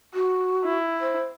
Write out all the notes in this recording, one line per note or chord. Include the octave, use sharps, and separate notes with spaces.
F#4
E4
C5